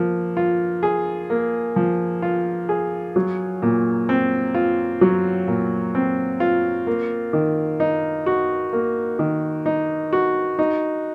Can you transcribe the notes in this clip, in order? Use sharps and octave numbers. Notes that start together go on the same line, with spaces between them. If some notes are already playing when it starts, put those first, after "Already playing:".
Already playing: F3 A#3
F4
G#4
A#3
F3
F4
G#4
F#3
A#2
C4
F4
F#3
A#2
C4
F4
A#3
D#3
D#4
F#4
A#3
D#3
D#4
F#4
D#4